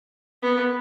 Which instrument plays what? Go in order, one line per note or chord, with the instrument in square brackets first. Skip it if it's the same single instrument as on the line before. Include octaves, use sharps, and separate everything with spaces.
[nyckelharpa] B3